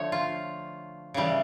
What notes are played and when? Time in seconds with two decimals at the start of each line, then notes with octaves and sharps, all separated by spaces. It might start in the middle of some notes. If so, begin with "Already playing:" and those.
Already playing: D3 F3 A3 C#5
0.12 F4
1.14 C#3 E3 G3